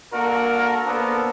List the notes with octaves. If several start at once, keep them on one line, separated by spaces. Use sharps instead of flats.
A#3 D4 F#4 A4 A#4
A#3 B3 D4 A4 A#4 C5